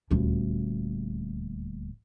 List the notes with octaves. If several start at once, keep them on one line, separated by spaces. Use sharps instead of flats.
D#1 D2